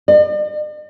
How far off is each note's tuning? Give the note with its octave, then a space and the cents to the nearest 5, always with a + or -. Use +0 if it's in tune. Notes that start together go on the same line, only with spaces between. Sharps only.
D5 +45